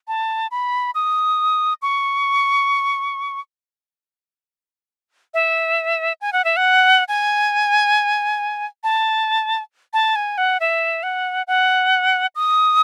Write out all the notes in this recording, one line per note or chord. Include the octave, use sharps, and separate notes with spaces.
A5
B5
D#6
C#6
E5
G#5
F#5
E5
F#5
G#5
A5
A5
G#5
F#5
E5
F#5
F#5
D#6